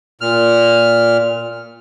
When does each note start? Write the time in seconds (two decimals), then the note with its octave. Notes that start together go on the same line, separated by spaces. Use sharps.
0.21 A#2 F6